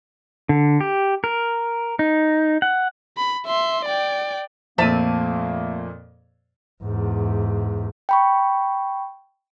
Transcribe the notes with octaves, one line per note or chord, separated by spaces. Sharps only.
D3
G4
A#4
D#4
F#5
B5
E5 C6
D5 G5
F2 A#2 A3 A#3 C4 E5 A5 D#7
E2 G#2
G5 B5 C#6